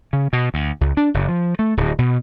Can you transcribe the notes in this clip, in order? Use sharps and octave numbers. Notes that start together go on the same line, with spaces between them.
C#3
B2
D2
C#2
D4
F#1
F3
A3
D1
B2